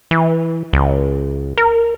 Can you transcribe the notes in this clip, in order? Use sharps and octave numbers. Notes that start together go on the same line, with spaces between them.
E3
C#2
A#4